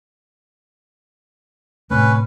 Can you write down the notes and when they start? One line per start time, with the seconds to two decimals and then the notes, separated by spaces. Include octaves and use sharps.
1.91 A2 C3 A3 C#4 B4